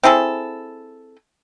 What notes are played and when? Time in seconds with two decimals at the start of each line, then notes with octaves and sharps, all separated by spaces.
0.03 C4 E4 G#4 A4